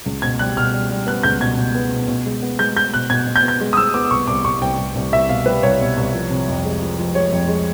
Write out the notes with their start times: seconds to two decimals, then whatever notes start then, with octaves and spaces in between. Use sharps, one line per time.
0.06 C#2
0.22 B2 G#6
0.39 G3 F#6
0.57 B2 F6
0.73 G3
0.90 G3
1.07 B3 F#6
1.23 C#2 G6
1.41 B2 G#6
1.57 B2
1.75 B3
1.92 B2
2.08 B2
2.26 G#3
2.42 B3
2.59 G#3 G6
2.76 G#3 G6
2.94 B2 F#6
3.10 B2 G#6
3.27 B2
3.36 G6
3.43 B3
3.48 G6
3.61 G#3
3.73 D#6
3.77 G#3 E6
3.94 B3 D6
4.11 C2 C#6
4.28 C2 D6
4.44 C2 C#6
4.61 C2 G5
4.78 C2
4.95 C2
5.12 C2 E5
5.29 B2 F5
5.46 G3 B4
5.63 C2 C#5
5.80 B2
5.97 C2
6.13 F3
6.30 C3
6.48 F2
6.65 G#3
6.81 F3
6.99 F3
7.15 G#3 C#5
7.32 F2
7.48 G#3